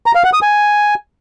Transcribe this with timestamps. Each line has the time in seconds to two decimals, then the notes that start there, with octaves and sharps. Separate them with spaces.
0.06 A#5
0.15 F5
0.24 F#5
0.33 D#6
0.42 G#5